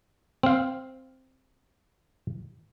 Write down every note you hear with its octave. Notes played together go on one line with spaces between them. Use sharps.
C4 F5